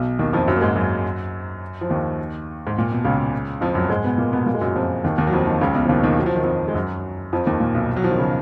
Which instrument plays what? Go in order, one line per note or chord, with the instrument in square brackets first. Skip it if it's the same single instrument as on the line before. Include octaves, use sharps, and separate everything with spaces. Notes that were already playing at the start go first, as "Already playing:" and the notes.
Already playing: [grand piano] B1 B2
D#2 D#3
F2 F3
F#2 F#3
A#3
G#2 G#3
F#2 F#3
F3
D#2 D#3
G#2
A#2
B2
C#2 C#3
F2 F3
F#2 F#3
G#2 G#3
B2 B3
A#2 A#3
B2 B3
A#2 A#3
G#3
F#2 F#3
F2 F3
D#2 D#3
D#2 D#3
F#3
F2 F3
D#2 D#3
C#2 C#3
B1 B2
F3
D#2 D#3
D#2 D#3
F#3
F3
D#3
F2 F3
G#3
F#2 F#3
F2 F3
D#2 D#3
A#2
B1 B2
F#3
F3
D#3
C#3